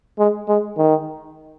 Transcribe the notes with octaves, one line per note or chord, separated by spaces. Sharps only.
G#3
G#3
D#3